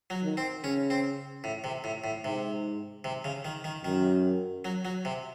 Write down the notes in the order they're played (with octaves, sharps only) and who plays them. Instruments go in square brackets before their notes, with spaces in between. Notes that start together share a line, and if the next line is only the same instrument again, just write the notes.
[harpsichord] F#3
[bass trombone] D#3
[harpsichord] C4
[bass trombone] C#3 [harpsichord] C#4
[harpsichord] C4
A2
C3
A2
A2
[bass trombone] G#2 [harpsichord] C3
[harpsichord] C3
C#3
D#3
D#3
[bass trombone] F#2 [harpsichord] D#3
[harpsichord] F#3
F#3
C3